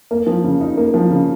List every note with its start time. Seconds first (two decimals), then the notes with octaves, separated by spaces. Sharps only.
0.11 A#3
0.27 F3
0.44 C#3
0.61 D#4
0.77 A#3
0.94 F3
1.10 C#3